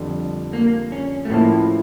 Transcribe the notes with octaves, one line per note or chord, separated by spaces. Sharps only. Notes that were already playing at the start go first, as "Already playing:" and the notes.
Already playing: F2 D3 G3
A#3
C#4
A3
A2 F3 A#3 C#4 E4 A4